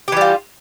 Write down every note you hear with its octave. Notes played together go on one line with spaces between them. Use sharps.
E3 G3 F4 G4